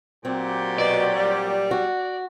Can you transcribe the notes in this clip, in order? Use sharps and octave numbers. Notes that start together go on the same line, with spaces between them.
A#2 F#3 C4 G4
B2 D5
G3
F#4